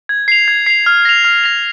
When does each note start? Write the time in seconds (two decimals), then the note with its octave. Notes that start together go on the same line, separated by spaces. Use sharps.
0.09 G#6
0.28 C7 F7
0.48 G#6
0.66 C7 F7
0.86 F6
1.05 A#6 F7
1.24 F6
1.44 A#6 F7